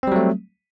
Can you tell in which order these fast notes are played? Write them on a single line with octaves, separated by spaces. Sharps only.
C4 G3 F#3 A3